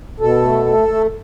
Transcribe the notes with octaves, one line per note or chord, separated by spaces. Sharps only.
B2 A4
A3
A3
A3